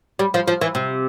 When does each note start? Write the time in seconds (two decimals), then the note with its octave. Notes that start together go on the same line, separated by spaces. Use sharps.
0.19 G3
0.34 F3
0.48 F3
0.61 E3
0.75 C3